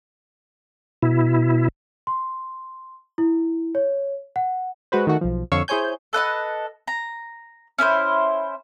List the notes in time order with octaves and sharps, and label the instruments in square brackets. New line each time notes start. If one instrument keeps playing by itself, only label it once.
[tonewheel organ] B2 E4
[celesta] C6
E4
C#5
F#5
[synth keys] G#3 F#4 B4 C5
D#3 A3 F#4
B1 F3
F2 D3 C#5 F5 C#6 E6
E4 G#4 C5 C#5 G#5 G6
[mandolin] A4 B4 D#5 F#5
A#5
C#4 E4 A#4 C5